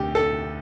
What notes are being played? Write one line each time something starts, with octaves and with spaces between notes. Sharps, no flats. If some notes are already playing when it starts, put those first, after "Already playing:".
Already playing: D2 D3 G4
A4